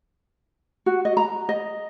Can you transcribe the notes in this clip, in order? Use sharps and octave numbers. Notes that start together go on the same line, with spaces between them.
F#4
D#5
A#5
D#5